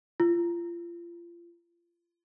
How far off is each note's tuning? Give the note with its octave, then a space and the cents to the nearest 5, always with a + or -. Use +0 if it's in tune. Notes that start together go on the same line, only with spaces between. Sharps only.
F4 -30